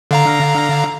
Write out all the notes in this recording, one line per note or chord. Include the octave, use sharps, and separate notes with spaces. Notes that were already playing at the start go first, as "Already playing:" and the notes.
D3 F5 A#5